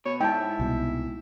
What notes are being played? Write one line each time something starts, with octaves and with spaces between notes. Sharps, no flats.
B2 C#5
G#2 E4 G5 A5
C2 B2